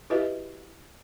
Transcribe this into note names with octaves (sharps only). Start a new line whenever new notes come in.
E4 F#4 G4 B4 D#5 E5